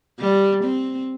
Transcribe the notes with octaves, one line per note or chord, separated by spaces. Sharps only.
G3
C4